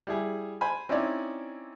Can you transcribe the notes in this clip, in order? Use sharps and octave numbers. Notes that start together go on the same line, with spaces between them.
G3 E4 G#4
C5 G#5 B5
C4 C#4 D#4 E4 C#5 D5